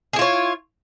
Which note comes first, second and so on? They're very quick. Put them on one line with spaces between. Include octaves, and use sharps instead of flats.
G#4 E4 F4 C#5